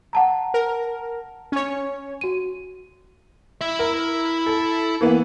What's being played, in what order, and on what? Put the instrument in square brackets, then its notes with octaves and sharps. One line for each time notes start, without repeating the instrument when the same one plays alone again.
[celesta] F#5 A5 A#5
[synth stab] A#4
C#4 C#5
[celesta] F#4 D#7
[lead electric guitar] E4 E5
[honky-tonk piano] A#4
A4
E3 A#3 B3